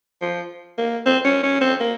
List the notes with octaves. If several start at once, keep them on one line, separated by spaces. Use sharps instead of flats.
F3
A#3
C4
C#4
C#4
C4
A#3